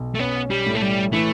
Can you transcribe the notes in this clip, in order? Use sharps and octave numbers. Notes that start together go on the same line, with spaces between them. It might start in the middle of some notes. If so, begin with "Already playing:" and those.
Already playing: B1
A3
B3 C#4
G3
A2
A3
G3
E3 A3